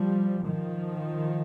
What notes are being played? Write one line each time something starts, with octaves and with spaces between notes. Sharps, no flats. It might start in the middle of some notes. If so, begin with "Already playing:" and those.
Already playing: F3 G3
D#3 F3